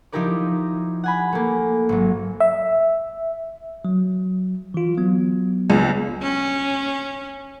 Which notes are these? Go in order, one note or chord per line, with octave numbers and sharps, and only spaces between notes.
F3 D#4 E4 G4 A#4 D5
F#5 G#5 B5
A3 A#3
G#1 F#3
E5
F#3
E3 F4
F#3 B3
C#2
C#4